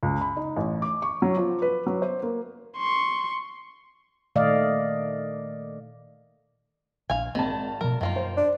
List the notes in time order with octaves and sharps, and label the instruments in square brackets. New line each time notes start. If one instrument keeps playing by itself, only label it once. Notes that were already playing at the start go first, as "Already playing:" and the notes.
[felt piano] C#2
B5
D#4
A1
D6
C#6
F#3
F3
B4
F#3
C5
A#3
[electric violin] C6 C#6
[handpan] A#2 D#3 A3 D5 D#5 F5
[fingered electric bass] A#1 D3 D4 [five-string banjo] F5 G#5
[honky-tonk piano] G#1 A5 [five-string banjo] D#3 [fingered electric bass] C4
[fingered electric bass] B2 F3 [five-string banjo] A#4
[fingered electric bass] F#2 [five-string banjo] D#3 A#3 F4
[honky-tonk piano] C5
[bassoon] D4